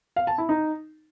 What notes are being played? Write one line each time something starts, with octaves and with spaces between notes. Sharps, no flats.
F5
A5
E4
D#4